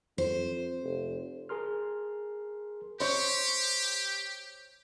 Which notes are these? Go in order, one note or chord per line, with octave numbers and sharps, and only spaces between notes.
F2 C5
F1
G#4 A#4 C6 F6
G4 C5 C#5